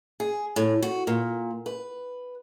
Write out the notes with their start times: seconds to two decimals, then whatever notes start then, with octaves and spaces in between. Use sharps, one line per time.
0.20 G#4
0.56 A2
0.82 F#4
1.07 A#2
1.66 B4